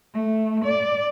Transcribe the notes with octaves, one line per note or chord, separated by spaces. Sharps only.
A3
D5